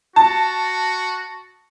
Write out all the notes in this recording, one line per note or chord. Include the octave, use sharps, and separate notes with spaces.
F#4 A5